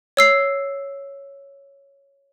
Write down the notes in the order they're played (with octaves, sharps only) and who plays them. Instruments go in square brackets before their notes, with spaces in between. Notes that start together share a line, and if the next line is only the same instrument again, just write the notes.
[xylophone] C#5 E6 C7